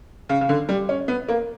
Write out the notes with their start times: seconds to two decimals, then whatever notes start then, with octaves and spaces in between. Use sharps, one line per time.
0.29 C#3
0.41 C#3
0.49 D3
0.69 G3
0.89 C#4
1.08 B3
1.28 A#3